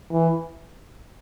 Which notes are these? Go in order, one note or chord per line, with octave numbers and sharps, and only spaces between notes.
E3